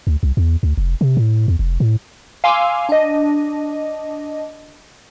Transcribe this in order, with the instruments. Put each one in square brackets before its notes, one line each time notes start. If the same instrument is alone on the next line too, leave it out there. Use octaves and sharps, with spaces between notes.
[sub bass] D2
C2
E2
D2
F1
C3
A2
E2
F1
A2
[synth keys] F5 G#5 C6 D6 E6
D4 D#5